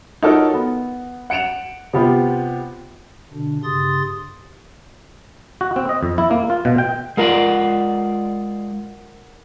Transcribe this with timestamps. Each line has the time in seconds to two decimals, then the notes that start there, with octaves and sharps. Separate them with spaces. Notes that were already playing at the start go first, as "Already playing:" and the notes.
0.22 D#4 F4 F#4 A4 A#4 C#5
0.54 B3
1.30 F#5 C#7 D7 E7 F7
1.93 C3 B3 F4 G4
3.33 B2 D3 D4
3.63 G2 C#3 G4 C6 D#6 A6
5.61 F#4
5.76 C4
5.89 D#5
6.03 F2
6.18 E4
6.31 A#3
6.50 F4
6.65 B2
6.78 G5
7.17 G#3 F4 A#4 D5 F#5